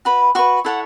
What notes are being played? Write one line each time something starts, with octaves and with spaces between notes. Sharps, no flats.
F#4 B4 B5
F#4 B4 C#6
E4 A4 C#5 F#5